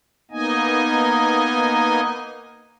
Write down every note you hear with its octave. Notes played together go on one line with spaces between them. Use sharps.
A#3 B3 D#4 D#5 G#5